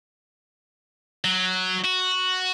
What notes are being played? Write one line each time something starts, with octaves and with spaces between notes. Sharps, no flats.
F#3
F#4